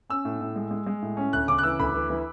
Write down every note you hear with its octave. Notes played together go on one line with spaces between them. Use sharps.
C#4 E6
A2
A2
G#3
G#3
G#3
A2
C#4
D2 F#6
C#3 D6
F#6
E3 E6
D2 B5
E3
E3